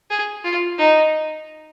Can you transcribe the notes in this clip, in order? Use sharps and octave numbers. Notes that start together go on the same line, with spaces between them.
G#4
F4
D#4